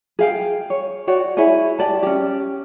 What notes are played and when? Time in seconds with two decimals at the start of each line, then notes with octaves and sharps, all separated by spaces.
0.19 G#4 F5 G5
0.70 C#5
1.07 F#4 C#5 D5 G5
1.37 E4 G#4 C#5 G#5
1.79 G4 D5 A5
2.03 C#4 G4